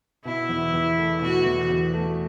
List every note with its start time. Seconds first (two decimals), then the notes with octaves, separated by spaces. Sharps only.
0.25 B2 E4
0.49 E2
0.73 E2
0.98 A3
1.21 B2 F#4
1.45 E2
1.70 E2
1.94 A3